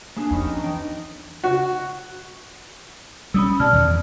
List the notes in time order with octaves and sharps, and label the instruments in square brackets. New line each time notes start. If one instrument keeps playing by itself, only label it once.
[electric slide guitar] A#3 G#4 [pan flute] D4 [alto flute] G#5
[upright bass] F2 [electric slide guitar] B3 C#4 G4 [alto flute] D#4
[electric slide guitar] E3 G5
[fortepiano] F#4
[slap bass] G3 C#4 [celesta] B5 D#6 E6
[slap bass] B2 [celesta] D5 A5 F6
[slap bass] E2 D#3